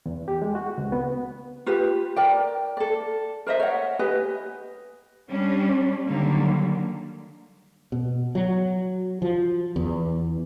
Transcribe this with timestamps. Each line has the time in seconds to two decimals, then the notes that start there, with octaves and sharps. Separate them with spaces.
0.06 E2
0.28 G4
0.42 G#3
0.55 F#4
0.78 C#2
0.92 B3
1.66 F4 G4 B4
2.16 A#4 D5 G5
2.77 A4 D5
3.47 A#4 C5 D#5 E5
3.60 C#5 F#5
3.99 G4 B4 D#5 G#5
5.29 G3 C#4 D4
6.06 D3 D#3 F#3 G3 A#3
7.92 B2
8.35 F#3
9.22 F3
9.76 E2